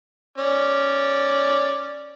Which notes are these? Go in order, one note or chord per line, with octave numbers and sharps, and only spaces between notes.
C#4 D5